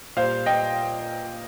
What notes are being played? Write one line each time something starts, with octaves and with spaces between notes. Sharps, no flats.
A#2 G3 C5 F5
D#5 G5